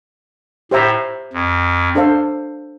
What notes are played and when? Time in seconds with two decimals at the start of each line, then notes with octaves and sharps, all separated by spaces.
0.71 A2 G4 C5 E5 A#5
1.33 F2
1.95 D4 A4 C5 F5